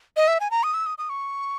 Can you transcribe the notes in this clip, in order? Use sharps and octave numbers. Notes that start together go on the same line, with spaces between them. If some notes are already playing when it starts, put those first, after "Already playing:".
D#5
E5
G#5
A#5
D#6
E6
D#6
D#6
C#6